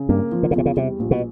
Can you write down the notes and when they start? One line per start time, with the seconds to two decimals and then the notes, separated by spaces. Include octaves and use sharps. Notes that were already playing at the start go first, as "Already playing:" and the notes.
Already playing: C#3
0.09 G2 A#3
0.32 F3
0.43 D3
0.51 C#3
0.55 E2 C3
0.66 C#3
0.77 C3 G3
0.99 A#1
1.11 B2